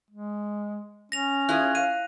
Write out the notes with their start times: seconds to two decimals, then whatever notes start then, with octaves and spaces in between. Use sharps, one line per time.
0.11 G#3
1.12 C#4 A#6 F7
1.49 E4 F4 G#4 F#6
1.75 F5 D#7